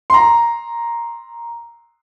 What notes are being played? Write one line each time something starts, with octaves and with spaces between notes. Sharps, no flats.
A#5 C6